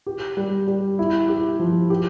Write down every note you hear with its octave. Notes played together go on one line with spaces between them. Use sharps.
G4
G3
G3
E4
G4
F3
G4